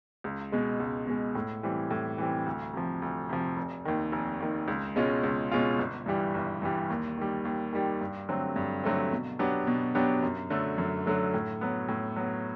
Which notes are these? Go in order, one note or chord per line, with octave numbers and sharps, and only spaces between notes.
C#2
B2 G#3
C#2
B2 G#3
A2
E3 G3 C4
A2
E3 G3 C4
D2
C3 F3
D2
C3 F3
F1
D#2 D#3
F1
D#2 D#3
C#2
B2 G#3 C#4 F4
C#2
B2 G#3 C#4 F4
G1
G2 E3 G3
G1
G2 E3 G3
D#2
D#3 G3
D#2
D#3 G3
G2
D3 F#3 A3 C4
G2
D3 F#3 A3 C4
B2
F#3 B3 D4 G4
B2
F#3 B3 D4 G4
F#2
D3 F#3 A3
F#2
D3 F#3 A3
A2
F#3 B3
A2
F#3 B3